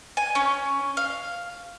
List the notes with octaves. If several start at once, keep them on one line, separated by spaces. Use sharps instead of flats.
G#5
C#4
F5